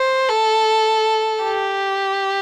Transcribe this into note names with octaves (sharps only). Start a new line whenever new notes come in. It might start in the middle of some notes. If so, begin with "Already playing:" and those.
Already playing: C5
A4
G4